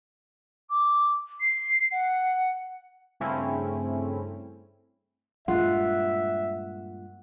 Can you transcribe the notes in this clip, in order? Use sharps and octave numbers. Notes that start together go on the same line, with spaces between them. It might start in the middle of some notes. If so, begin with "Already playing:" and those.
D6
C7
F#5
G2 C#3 A3 C4 C#4 E4
G2 A#2 G#3 F4 E5 F#5